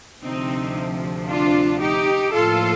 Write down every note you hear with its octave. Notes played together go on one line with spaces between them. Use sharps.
D2 C3 F3 C4 D#4
D4 F4
D#4 G4
A2 F3 A#3 F4 A4